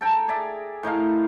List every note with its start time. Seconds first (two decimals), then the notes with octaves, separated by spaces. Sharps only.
0.01 A4 G5 A#5
0.28 G#4 D5 E5
0.83 A2 D#4 A#4 F5